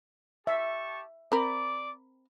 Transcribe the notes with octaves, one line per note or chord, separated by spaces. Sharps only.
G4 E5 A5 C#6
C4 A#4 D5 B5 D6